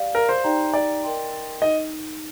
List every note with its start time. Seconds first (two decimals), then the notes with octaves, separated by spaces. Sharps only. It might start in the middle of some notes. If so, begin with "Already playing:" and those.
Already playing: G4 D5 F5
0.15 A#4
0.29 C5
0.44 D#4 G4 D5 G5 A#5
0.74 D5
1.03 A#4 D#5 G5 C6
1.62 D#4 D#5